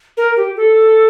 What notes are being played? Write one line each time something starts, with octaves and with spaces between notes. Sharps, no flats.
A#4
G4
A4